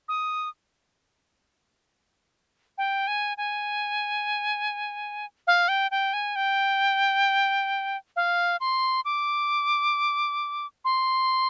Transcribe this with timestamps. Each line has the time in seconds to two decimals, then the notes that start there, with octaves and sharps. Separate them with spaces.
0.08 D#6
2.78 G5
3.07 G#5
3.37 G#5
5.47 F5
5.68 G5
5.91 G5
6.13 G#5
6.36 G5
8.16 F5
8.60 C6
9.05 D6
10.85 C6